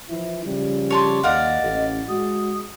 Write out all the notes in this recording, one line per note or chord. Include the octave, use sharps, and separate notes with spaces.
E3 F3 E4
C#3 F3 G3
G4 C#5 A5 C6
D#2 D5 D#5 F5 F#5
A1
G#3 F#4 D#6